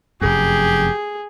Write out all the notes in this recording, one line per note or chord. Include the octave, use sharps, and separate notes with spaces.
F1 F#2 G4 G#4